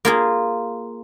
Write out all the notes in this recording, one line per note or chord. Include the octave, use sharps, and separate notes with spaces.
A#3 F4 G#4